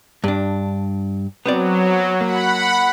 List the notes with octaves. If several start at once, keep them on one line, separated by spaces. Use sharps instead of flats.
G2 D4
F#3 B3 C4 D5
A#3 F#5 B5